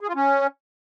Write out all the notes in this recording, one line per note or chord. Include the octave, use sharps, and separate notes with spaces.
G#4
F4
C#4